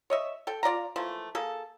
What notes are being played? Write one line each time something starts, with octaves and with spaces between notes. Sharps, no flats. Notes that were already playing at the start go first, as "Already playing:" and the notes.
C#5 D#5 E5
A4 G5
F4 D5 F5 A#5
E3 F3 A3 A#3
A#3 G#4 A4